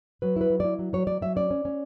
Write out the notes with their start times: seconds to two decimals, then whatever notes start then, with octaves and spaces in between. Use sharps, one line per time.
0.22 F#3 B4
0.36 E4 B4
0.50 F#3
0.60 E4 D5
0.79 F#3
0.93 F#3 C#5
1.07 F#3 D5
1.21 F#3 E5
1.36 C#4 D5
1.51 C#4
1.65 C#4